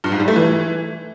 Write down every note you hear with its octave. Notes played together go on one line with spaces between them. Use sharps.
G2
G#2
G3
A3
E3